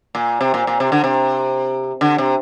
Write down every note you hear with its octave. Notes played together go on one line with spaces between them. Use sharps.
A#2
C3
A#2
A#2
C3
D3
C3
D3
C3